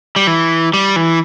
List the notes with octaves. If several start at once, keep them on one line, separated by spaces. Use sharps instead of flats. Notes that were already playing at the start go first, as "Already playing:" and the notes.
G3
E3
G3
E3